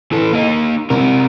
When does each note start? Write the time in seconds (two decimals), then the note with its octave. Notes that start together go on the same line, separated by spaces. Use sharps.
0.12 E3 A4
0.33 A#3 D#4
0.90 C3 A#4